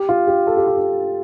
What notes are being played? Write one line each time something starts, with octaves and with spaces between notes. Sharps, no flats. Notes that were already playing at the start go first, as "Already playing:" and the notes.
Already playing: G4
F4
G4
A4
G4
F4
G4